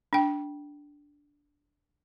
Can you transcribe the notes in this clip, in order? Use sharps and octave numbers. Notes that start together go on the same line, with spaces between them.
D4 G5